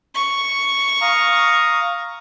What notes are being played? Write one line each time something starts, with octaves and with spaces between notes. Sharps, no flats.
C#6
F5 A#5 D#6